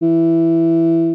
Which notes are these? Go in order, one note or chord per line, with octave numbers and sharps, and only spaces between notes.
E3